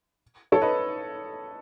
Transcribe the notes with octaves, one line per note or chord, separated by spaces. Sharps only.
A4 C#5
B4 D#5